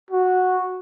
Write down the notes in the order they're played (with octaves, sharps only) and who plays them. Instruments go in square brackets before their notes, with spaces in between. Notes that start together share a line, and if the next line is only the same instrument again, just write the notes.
[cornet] F#4